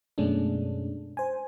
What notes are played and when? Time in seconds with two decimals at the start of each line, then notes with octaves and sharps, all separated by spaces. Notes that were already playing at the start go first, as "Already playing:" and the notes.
0.18 F#2 B2 G#3 A3 C#4 D4
1.17 C5 G#5